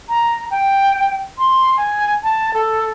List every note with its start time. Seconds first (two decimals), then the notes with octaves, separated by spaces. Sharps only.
0.09 A#5
0.51 G5
1.38 C6
1.77 G#5
2.23 A5
2.54 A4